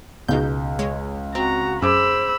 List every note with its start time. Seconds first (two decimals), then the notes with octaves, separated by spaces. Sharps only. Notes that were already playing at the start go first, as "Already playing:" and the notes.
0.28 C#2 B2 D#4 G6
0.79 G#3 C#5
1.35 C4 F#4 A#5
1.82 F#2 G#4 C5 B5 D6 E6